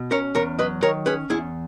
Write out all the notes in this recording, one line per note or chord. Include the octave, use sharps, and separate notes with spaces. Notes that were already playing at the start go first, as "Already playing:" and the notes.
Already playing: B2
C#4 A#4 C#5
E2 A#4 C#5
F#3 B4 D#5
D#3 A#4 C#5
C#4 G#4 B4
E2 E4 G#4